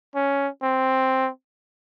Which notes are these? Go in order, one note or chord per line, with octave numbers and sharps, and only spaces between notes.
C#4
C4